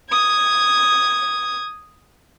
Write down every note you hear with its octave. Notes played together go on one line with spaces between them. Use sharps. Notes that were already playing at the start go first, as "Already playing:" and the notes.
D#6 G#6